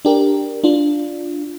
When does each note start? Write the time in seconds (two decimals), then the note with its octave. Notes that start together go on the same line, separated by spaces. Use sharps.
0.05 D4 G4 A#4
0.64 D4 F4